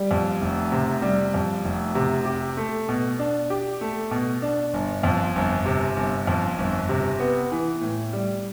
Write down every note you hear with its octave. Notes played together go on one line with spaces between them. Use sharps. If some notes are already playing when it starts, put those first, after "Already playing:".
Already playing: G3
F2
F1
C3
G3
F2
F1
C3
G4
A3
B2
D4
G4
A3
B2
D4
G1
F2
G1
C3
G1
F2
G1
C3
B3
E3
A2
G3